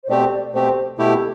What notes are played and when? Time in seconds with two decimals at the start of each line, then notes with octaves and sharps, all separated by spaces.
0.04 C5
0.09 B2 A3 C4 G4 D5
0.31 D5
0.54 B2 A3 C4 G4 C5
0.98 B2 A3 E4 G4 A4
1.16 A4